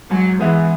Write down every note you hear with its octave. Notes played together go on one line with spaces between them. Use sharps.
G#2 F#3
E3 G#3 B3 E4 G#4